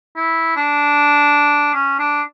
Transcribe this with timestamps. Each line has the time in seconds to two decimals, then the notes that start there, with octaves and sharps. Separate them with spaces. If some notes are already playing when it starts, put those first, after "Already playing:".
0.16 E4
0.57 D4
1.74 C#4
2.00 D4